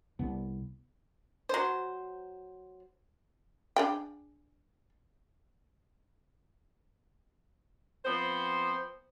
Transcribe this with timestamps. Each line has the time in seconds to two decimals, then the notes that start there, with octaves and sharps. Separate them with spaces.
0.19 C2 B3
1.49 F#3 C5
3.76 D4 G#4 G5
8.05 F3 B3 C4 C5